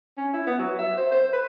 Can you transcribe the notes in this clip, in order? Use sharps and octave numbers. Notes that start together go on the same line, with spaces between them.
C#4
E4
B3
F#3
E5
C5
C5
B4